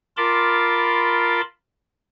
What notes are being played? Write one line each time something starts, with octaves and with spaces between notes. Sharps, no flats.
F4 A#4 A5 B5 C6 D6